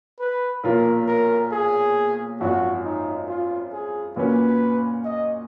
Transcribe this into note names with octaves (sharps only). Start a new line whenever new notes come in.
B4
B1 A#2 F3 A#3 F4 A#4
A#4
G#4
G#1 F#2 F3 F#4
D#4
F4
G#4
A#2 F#3 A#3 C#4 B4
D#5